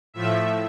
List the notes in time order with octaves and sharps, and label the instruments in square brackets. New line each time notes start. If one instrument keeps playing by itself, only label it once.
[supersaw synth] A2 F3 A3 E5